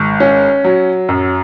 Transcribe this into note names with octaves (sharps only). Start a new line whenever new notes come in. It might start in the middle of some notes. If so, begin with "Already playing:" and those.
Already playing: G#1
C#4
F#3
F#2